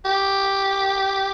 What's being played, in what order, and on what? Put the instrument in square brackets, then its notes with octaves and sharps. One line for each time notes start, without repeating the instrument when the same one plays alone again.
[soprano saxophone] G4